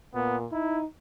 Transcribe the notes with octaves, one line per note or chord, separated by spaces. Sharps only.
A#2 B3
D#4 E4